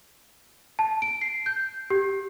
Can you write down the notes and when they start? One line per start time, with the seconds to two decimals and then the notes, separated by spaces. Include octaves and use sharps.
0.79 A5
1.02 D7
1.21 C7
1.46 G6
1.90 G4